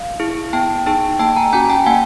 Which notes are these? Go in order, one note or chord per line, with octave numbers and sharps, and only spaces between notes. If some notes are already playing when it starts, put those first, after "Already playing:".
Already playing: F5
E4 G#4
B3 G5 A5
D#4 G#4 G5 A5
A#3 G5 A5
G#5 A#5
C#4 F#4 G#5 A#5
G5 A5
A#3 F#5 G#5